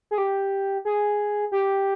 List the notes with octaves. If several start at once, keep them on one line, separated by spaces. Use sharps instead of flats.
G#4
G4
G#4
G4